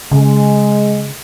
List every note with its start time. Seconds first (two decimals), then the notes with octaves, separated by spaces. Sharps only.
0.11 C#3 G#3